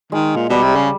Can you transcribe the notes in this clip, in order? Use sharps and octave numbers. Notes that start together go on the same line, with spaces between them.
D#3 G#3
A#2
B2 G3
C3
C#3